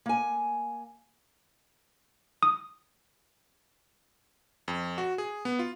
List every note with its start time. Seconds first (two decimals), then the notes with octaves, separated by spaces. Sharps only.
0.06 A#3 G#5
2.43 D#6
4.68 F2
4.98 F#4
5.18 G#4
5.45 B3
5.59 F4